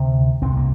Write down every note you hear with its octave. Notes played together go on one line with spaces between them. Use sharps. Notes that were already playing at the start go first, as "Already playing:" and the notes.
Already playing: D2 C3
C2 C3 C4
A#3